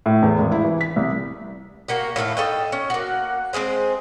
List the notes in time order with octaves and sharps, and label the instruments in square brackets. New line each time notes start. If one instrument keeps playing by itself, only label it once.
[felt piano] A2
E2
G#1
E4
E3
B6
C2
[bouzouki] A#3 F#4 G4
A2 D#3 A3 F5
A4 D#5 G5
C#4
A#3 F#4
G#3 C4 G#4 C5